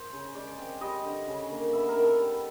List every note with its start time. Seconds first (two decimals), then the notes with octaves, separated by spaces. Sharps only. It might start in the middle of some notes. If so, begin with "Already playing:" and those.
Already playing: C5
0.13 C#3
0.35 G#3 D5
0.58 C4
0.81 G3 D#5
1.05 D3
1.28 C#3
1.50 A#3
1.73 B3 E5
1.89 A#4
1.96 D#3
2.04 A4
2.19 G3